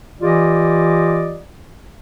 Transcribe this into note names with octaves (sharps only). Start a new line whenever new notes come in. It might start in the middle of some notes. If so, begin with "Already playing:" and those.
E3 F4 G4 D5 D#5